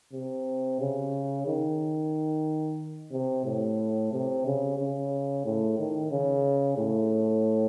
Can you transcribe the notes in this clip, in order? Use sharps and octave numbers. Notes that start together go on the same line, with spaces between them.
C3
C#3
D#3
C3
A2
C3
C#3
C#3
A2
D#3
C#3
A2